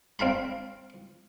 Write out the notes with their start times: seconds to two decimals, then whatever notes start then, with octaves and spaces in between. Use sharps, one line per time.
0.19 C4 F5 A#5 B5